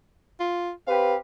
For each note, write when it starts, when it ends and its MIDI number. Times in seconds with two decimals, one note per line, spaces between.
0.40 0.72 65
0.87 1.14 60
0.87 1.14 67
0.87 1.14 71
0.87 1.15 77